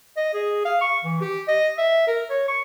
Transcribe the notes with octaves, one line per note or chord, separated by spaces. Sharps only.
D#5
G#4
F5
C#6
E3
G4
D#5
E5
A#4
C#5
C#6